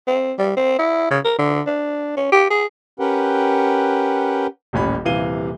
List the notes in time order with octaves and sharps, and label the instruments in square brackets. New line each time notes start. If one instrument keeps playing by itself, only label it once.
[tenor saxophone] C4
G3
C4
E4
C#3
A#4
D3
D4
C#4
G4
G#4
[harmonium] C#4 G4 A#4 B4 F#5 G5
[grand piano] D#1 A1 C#4 B5
D#1 C3 E3 F5 D#7 G7